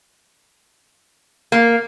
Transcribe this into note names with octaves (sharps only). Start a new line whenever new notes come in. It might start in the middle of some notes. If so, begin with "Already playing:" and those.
A#3